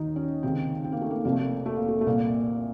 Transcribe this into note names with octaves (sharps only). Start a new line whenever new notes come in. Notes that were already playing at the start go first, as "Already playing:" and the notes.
Already playing: D#2 D#3 D#4
C#4
C#2 C3 D#3 C4
C4
A#3
A3
A#3
F1 F2 C3 A#3
A3
A#3
A3
A#3
A3
A3
C2 A#2 A#3